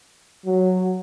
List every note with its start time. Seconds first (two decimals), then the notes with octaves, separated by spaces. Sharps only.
0.46 F#3